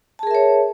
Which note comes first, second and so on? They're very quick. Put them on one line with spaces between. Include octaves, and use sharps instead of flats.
A5 G#4 A#4 E5 C#5